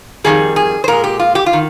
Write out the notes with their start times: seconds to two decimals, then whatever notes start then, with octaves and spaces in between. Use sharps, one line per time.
0.24 F2 C3 D#3 G3 G#4
0.56 G#4
0.84 C5
0.88 A#2 G#3 A#4
1.04 G4
1.20 F4
1.35 G4
1.46 F4
1.53 D#3